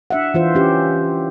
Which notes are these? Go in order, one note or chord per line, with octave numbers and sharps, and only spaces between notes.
D4 E5 F#5
E3 F4 C5
C#4 G4